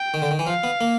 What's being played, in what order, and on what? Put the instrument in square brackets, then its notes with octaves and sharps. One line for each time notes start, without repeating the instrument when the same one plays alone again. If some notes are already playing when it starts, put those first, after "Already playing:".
Already playing: [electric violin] G5
[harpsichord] D#3
D3
D#3
E3
[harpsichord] F3 [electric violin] F5
[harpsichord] B3
A#3